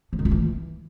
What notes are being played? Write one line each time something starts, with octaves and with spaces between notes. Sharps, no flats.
F3
D#3
F4
E3